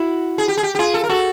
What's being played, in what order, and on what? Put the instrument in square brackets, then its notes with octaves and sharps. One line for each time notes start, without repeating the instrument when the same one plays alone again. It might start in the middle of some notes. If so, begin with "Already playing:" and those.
Already playing: [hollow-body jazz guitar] E4 [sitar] F#4
[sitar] G#4
G4
G#4
G4
G4
[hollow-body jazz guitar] F4 [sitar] G#4
[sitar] A4
A#4
[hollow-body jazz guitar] F#4 [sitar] A4